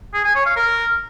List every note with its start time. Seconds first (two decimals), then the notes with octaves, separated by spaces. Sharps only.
0.14 G#4
0.25 G#5
0.35 C#5
0.46 F5
0.56 A#4